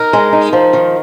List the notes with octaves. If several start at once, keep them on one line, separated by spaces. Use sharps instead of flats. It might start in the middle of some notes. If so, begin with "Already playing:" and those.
Already playing: D#4 A#4
G#3
D#4
F3
D#3